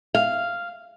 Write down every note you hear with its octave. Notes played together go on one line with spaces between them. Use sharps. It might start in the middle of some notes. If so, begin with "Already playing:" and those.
F5